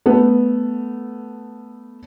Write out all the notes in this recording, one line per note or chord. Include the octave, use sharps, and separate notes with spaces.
A3 B3